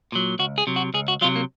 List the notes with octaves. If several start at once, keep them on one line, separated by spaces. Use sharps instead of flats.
A#2 F#3
C#2 F#4
G#4
C3 F#3
F#4
C#2 G#4
F#4
C3 F#3 F4
A#3